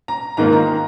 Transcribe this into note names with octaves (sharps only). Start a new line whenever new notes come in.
A#5
G#2 D#3 A#3 F4 A#5
A#5